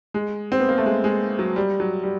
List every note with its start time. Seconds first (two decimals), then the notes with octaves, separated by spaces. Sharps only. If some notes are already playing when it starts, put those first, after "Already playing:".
0.14 G#3
0.52 C4
0.60 B3
0.69 A#3
0.78 A3
0.86 G#3
1.04 G#3
1.39 F#3
1.56 G3
1.80 F#3
2.03 G3